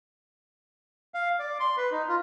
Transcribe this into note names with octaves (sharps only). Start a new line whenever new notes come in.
F5
D5
C6
B4
D#4
F4